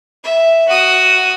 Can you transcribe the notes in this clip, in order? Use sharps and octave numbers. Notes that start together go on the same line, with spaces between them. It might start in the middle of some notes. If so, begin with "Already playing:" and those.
E5
F#4 D#6